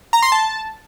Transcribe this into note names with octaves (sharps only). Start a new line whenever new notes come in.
A#5
C6
A5